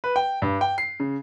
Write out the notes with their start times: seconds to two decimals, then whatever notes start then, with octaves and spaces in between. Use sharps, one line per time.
0.04 B4
0.16 G5
0.42 G2
0.61 G5
0.78 C7
1.00 C#3